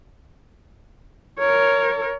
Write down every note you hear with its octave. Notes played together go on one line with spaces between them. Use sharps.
A#4 C#5